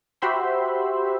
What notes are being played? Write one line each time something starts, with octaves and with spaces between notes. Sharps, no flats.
F#4 G4 C5 E5 B5 C6